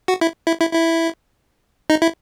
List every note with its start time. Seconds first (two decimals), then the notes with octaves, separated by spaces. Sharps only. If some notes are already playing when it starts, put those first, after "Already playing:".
0.08 F#4
0.21 E4
0.47 E4
0.60 E4
0.73 E4
1.90 D#4
2.02 E4